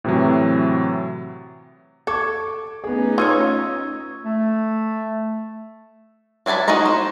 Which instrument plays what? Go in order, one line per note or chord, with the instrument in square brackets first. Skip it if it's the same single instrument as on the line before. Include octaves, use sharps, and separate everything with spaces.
[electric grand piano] A2 C3 E3 F#3
[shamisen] A4 [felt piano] C#6 D6 G#6
[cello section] A3 C#4 D#4 [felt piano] B3 G#4
[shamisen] F4 B4 C#5 [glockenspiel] C#6 E6 G#6 [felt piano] D#6
[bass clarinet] A3
[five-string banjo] F#3 D4 G#5 A5 B5
D#4 F#4 A#4 D#5 A#5
C5